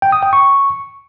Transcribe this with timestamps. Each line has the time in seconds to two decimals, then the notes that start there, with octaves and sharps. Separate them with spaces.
0.02 G5
0.12 D#6
0.23 G5
0.33 C#6